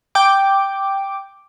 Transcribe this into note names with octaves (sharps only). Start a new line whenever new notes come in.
G5 D6